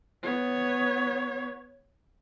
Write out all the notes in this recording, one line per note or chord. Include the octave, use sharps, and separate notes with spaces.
B3 C#5